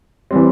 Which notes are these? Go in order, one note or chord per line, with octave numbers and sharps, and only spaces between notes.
E3 G3 C4